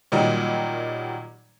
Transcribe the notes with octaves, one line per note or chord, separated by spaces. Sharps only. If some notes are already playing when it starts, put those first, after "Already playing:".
A#2 D#3 F#3 G3 D#4